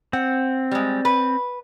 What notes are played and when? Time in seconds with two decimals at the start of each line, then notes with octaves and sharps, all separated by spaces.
0.13 C4 F#5
0.71 G3 G#3
1.05 B4